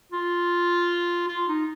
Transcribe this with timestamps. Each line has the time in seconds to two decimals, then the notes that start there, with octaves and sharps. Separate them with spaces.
0.12 F4
1.28 F4
1.48 D#4